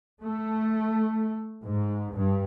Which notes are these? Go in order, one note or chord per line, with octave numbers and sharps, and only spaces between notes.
A3
G#2
G2